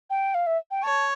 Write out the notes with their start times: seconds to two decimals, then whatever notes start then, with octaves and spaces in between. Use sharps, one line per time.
0.10 G5
0.35 F5
0.47 E5
0.71 G5
0.83 C#5 A5